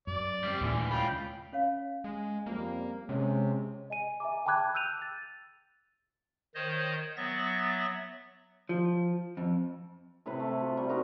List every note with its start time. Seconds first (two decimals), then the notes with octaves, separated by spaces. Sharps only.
0.07 F#2 D5
0.44 G3 C4
0.61 D#2 A#2 D3 E3 A3
0.90 C#2 F4 G5 B5
1.53 C#4 C#5 F5
2.04 G#3
2.46 F2 F3 G3 A#3
3.09 C3 G#3 C#4 C#5
3.90 D#5 G#5 D#7
4.20 E5 G#5 A#5 D6
4.46 G5 A5 B5 D6 F#6 G#6
4.75 E6 F#6 G6 D#7 F7
5.02 A6
6.55 D#3 C5 C#5 D#5
7.17 F#3 B3 E5 A6 A#6
8.69 F3
9.37 F2
10.26 A2 C3 E4 B4
10.40 A3
10.60 F4 F#4
10.77 G3
10.89 D#4 F#4 A#4